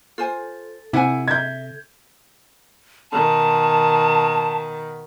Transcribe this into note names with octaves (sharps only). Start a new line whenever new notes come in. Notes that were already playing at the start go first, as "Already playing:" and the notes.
F4 A4 C5 G#5
C3 E4 G4 F#5 G#5
E5 G6 G#6
B2 D#3 A5